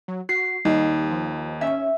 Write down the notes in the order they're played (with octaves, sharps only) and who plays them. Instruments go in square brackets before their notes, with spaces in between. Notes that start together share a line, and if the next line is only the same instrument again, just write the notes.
[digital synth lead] F#3
[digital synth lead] F#4 [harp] C7
[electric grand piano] D#2 [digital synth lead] G3 [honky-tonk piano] D#4
[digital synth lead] F3
[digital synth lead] C#4 [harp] E5